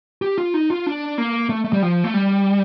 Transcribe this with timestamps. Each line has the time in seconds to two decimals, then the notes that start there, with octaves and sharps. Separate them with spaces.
0.22 G4
0.38 F4
0.54 D#4
0.70 F4
0.86 D4
1.18 A#3
1.49 A3
1.64 A3
1.73 G3
1.82 F3
2.04 A3
2.14 G3